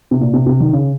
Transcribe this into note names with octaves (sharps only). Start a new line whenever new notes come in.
C3
A#2
C3
C3
D#3
C#3